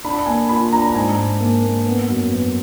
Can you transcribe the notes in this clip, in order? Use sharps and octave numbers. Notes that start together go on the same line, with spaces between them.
D4 B5
B5
A#3 G#5
F4 B5
D4 A#5
A#5
G#2 G#5
G#2
A#3
A#3
B3
F#2
B3